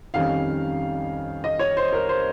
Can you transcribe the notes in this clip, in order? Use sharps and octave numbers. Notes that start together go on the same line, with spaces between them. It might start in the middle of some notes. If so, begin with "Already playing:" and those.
F2 D#3 G3 C#4 F5
D#5
C#5
C5
A#4
C5